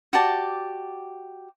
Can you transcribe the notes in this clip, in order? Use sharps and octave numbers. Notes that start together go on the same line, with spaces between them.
F#4 G4 D5 A5